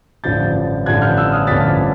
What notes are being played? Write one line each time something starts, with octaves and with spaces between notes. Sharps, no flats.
A1 G2 D3 F3 G6 A6
A1 G2 D3 F3 F#6 G#6
F6 G6
E6 F#6
D#6 F6
A1 G2 D3 F3 A6 B6